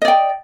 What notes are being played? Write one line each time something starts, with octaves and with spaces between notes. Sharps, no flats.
D5 D#5 G5